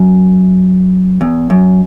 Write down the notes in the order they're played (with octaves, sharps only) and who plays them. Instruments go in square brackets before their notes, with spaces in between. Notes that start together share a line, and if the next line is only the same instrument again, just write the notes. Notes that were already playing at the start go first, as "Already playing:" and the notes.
Already playing: [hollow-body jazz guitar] F#2
E2
F#2